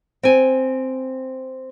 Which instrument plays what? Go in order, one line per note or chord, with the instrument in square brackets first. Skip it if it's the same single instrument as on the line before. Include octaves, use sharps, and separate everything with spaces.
[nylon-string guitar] C4 G#5